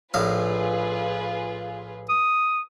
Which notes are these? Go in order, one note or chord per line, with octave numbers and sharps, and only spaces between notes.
A#1 A2 F4 G#4 B4 F5
D#6